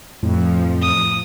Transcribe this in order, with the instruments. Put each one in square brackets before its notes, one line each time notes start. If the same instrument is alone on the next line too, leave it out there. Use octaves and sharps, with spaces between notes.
[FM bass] F2 [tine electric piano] A2 [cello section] F3
[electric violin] D#6